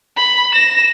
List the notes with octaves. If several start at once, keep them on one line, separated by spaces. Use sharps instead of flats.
B5
A#6 E7